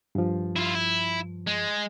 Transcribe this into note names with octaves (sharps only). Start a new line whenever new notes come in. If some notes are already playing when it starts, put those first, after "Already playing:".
G2 F3
E4 F4
E4
G#3